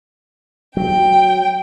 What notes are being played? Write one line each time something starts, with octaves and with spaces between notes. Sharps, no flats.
F#3 G5